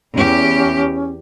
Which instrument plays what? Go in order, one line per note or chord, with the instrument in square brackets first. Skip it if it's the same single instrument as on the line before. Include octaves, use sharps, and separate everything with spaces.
[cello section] E2 G4 [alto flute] C#4